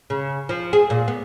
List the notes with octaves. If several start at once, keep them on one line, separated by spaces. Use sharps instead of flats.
C#3
F3
G#4
A#2
B3